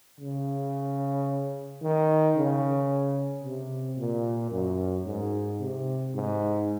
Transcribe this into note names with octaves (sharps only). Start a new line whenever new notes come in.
C#3
D#3
C#3
C3
A#2
F#2
G#2
C3
G#2